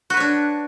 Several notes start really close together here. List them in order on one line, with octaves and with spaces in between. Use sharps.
F#4 B4 C#5 D4